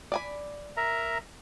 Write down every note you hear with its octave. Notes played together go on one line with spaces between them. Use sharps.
D5 G#5 B5
A#4 E5 A#5